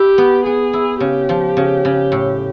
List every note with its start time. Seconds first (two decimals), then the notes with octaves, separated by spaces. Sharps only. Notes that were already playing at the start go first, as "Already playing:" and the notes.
Already playing: E4 G4
0.18 B3
0.45 B3 G#4
0.73 E4
1.00 C#3 G4
1.29 F3
1.57 C#3
1.85 C#3
2.12 A2